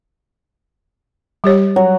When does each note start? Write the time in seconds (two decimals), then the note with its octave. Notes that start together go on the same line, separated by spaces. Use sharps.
1.44 G3 G4 C#5
1.76 F#3